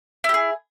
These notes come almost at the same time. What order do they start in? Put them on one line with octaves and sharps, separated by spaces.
E4 G4 G#4